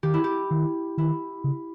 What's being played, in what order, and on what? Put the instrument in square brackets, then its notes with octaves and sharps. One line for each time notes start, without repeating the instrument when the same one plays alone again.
[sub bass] D#3 [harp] G4
[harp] E4
G4
[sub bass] D#3
[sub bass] D#3 [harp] E4
[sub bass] C#3